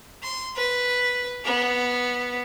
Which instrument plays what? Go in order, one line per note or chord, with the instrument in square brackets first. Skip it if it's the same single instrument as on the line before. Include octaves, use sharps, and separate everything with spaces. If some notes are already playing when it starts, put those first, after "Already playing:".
[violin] C6
B4
B3